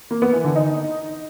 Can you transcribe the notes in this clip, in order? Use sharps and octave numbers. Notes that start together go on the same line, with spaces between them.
A#3
B3
E3
D3
D#4